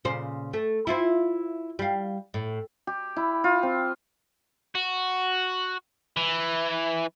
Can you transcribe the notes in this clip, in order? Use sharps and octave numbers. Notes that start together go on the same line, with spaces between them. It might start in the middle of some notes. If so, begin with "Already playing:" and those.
A#2 C#3 C5
A3
E4 F4 C5
G3 F5
A2
G4
E4
F4
C4
F#4
E3